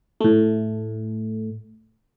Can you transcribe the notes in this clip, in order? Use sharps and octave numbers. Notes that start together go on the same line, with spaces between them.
A2 A3